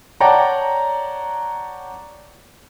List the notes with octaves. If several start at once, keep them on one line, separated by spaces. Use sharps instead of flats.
C#5 D5 F#5 G5 A5 A#5